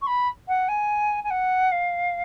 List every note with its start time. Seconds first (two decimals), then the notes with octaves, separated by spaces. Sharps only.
0.01 C#6
0.07 B5
0.48 F#5
0.68 G#5
1.24 G#5
1.30 F#5
1.72 F5